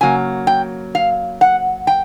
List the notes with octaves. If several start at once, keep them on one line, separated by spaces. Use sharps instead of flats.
C#3 F#3 A#3 G#5
G5
F5
F#5
G5